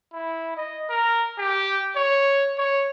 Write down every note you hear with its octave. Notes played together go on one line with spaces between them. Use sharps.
E4
D#5
A#4
G4
C#5
C#5